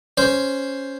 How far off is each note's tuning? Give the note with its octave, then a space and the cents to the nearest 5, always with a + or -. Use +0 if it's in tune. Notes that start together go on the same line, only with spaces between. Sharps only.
C#4 +0 C5 +0